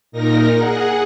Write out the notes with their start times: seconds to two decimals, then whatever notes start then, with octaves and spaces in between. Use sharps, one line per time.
0.12 A#2 D#4 A#4 A#6
0.56 G#4 F#5